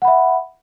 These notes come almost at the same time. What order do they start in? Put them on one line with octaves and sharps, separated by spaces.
F#5 B5 E5